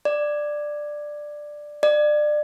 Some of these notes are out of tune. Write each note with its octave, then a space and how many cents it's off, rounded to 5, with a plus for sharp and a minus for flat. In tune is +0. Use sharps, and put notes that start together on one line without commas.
D5 +10
D5 +25